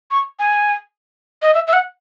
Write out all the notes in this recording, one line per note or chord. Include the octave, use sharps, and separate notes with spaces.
C#6
G#5
D#5
E5
E5
F#5